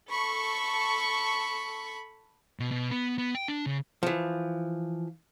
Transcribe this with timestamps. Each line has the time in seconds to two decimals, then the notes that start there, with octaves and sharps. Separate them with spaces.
0.11 A4 B5 C#6
2.60 B2
2.71 B2
2.91 B3
3.18 B3
3.35 G5
3.48 D4
3.66 C#3
4.03 E3 F3